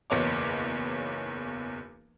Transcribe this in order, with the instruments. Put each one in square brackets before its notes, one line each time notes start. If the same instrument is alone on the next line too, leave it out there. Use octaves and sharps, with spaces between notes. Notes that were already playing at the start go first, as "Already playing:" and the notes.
[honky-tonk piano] F#1 B1 E2 C#5 D6